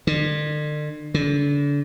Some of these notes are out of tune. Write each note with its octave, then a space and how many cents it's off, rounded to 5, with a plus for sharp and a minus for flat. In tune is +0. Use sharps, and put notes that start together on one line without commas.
D3 +40
D3 -35